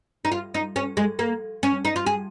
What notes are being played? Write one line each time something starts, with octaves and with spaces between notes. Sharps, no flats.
D#4
F4
D#4
C#4
G#3
A#3
C#4
D#4
F4
G#4